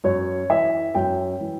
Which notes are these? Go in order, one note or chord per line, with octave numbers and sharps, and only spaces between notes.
F#2 C#5
E3 E5
F#2 G5
E3